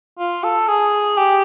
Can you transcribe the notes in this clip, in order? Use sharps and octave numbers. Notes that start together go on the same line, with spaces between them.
F4
A4
G#4
G4